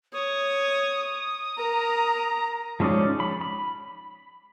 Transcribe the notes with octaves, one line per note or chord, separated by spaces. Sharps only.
C#5 D#6
A#4 A#5
F3 G#3 C#4 D#4 D5
B5
B5